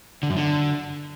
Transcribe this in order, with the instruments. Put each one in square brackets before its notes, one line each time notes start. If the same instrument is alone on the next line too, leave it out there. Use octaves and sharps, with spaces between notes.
[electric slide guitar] D3
F#2
D3